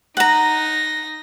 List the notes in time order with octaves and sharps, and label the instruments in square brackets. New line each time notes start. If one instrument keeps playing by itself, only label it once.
[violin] D#4 A#6 [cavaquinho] F#5 A#5